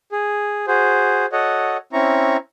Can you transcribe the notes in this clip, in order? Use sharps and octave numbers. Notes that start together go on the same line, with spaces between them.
G#4
F#4 G#4 C5
F#4 A4 C#5 D#5 F#5
C4 C#4 E4 A#5 C#6